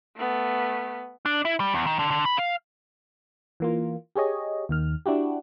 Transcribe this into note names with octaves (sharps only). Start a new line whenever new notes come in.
A3 B3
D4
E4
G3
E2
D#3
D3
D3
B5
F5
E3 A#3 F4
G4 G#4 C#5 D#5
D#2 D#3 F6
D4 E4 F#4 G4